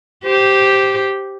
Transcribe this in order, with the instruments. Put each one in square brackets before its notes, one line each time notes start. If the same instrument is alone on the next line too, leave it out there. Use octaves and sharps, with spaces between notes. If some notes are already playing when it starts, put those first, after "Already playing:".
[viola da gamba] G4 C5